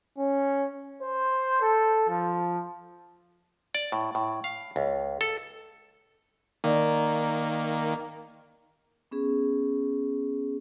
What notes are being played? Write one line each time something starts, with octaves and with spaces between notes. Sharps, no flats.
C#4
C5
A4
F3
D5
A2
A2
F5
C#2
A4
D#3 A#3 A#4 D5
B3 C#4 G#4